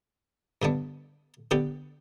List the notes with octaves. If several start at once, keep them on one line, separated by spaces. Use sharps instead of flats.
G2 D3 B3 D4
D3 B3 G4 B4